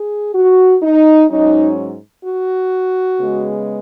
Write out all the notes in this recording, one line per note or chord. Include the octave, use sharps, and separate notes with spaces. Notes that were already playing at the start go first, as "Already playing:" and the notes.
Already playing: G#4
F#4
D#4
G#2 F#3 C#4 D#4
F#4
C#3 G#3 B3